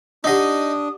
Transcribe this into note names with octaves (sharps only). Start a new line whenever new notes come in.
D4 D#4 G4 D#5 F#5 D6 D#6